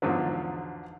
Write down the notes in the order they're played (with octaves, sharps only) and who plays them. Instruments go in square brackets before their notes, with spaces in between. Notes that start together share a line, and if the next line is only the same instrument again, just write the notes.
[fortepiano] E2 G#2 D3 F3 F#3